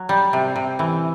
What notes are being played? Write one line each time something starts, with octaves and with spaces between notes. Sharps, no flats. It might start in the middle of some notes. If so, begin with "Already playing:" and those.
Already playing: F#3
G3
C3
C3
E3